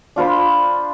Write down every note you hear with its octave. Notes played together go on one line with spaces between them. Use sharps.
D4 F4 C5 B5